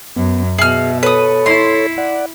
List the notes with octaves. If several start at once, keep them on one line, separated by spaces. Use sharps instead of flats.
F#2 B3
B2 G#4 E5 F6
A4 B4 C#5 D#6
E4 C6
D5 F#5